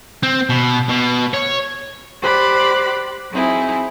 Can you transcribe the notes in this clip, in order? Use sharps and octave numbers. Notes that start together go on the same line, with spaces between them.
C4
B2
B2
C#5
G4 C5 D5 B5 F#6
F#3 C4 D#4 E4 G#4